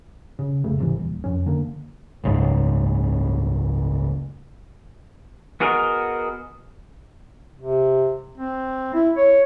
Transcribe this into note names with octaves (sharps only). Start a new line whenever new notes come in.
C#3
F1 C2 C#3 A3
G#1 C3 E3
D#1
F2 C#4
D3 A#3
F#1 C#2 G#2
B3 F#4 G#4 A#4 D#5
C3
C4
E4
C#5